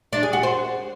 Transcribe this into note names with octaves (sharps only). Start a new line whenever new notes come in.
D4
G#4
F#4
C5